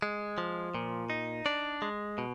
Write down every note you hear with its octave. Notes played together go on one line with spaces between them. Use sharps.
G#3
F3
A#2
D#4
D4 D5
G#3
B2